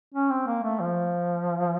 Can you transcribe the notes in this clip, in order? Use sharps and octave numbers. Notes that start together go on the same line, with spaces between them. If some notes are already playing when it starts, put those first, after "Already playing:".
C#4
C4
A#3
A3
F3